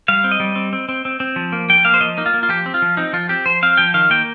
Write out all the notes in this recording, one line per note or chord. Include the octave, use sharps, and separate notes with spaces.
G3 F5
C4
D#5
G3
C4
C4
C4
C4
C4
F3
A#3
F3 G5
A#3 F5
C5
F3 D#5
A#3 D#4
F4
A#3
F4
F3 G4
C4
F4
F3
C4 D#4
F3 F4
C4 G4
F3 C5
C4 F5
F3 G5
D#3 F5
A#3 G5